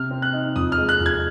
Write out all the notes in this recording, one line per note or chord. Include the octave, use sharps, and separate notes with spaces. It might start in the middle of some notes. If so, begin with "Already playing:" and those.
Already playing: C3 F6
C4
F#6
D#4
F2 D#6
F6
G#3
F#6
F2
G#6